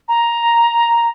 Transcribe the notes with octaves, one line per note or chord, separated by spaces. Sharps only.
A#5